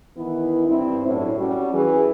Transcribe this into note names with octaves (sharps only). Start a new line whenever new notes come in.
D#3 E3 B3 E4
G2 C4 E4
F#2 A2 D3 G3 E4 C#5
G3 C#4 F#4
E3 G#4